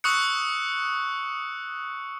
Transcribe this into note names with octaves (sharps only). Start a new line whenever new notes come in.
C#6 D#6 E6 F#6 C#7